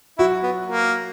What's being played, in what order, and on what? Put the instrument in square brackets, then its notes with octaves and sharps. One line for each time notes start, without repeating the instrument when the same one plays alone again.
[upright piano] F#3 F#4 [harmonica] E4
[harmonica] B3
A#3